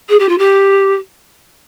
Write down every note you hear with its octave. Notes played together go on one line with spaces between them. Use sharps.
G#4
G4
F4
G4